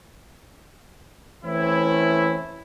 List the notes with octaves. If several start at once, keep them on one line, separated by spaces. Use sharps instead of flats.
E3 A3 C4 C#4 E4